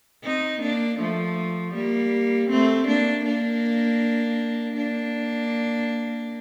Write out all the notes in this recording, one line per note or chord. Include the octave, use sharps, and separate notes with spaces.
C4 D#4
A#3 D4
F3 A3
G3 A#3
A3 C4
A#3 D4
A#3 D4
A#3 D4